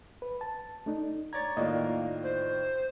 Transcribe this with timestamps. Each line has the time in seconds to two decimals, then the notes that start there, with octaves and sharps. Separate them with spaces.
0.22 B4
0.41 A5
0.86 A3 D4 D#4
1.33 C#5 D5 A#5 G#6 A6
1.57 A2 D#3 A#3 F4 D5 D#5
2.23 C5